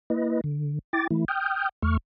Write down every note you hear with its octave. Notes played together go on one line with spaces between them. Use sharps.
A#3 E4 B4 D#5
D3
E4 G5 D6 A6
E3 A3 E4
G5 D#6 F6 G6
E2 A3 C#6 F6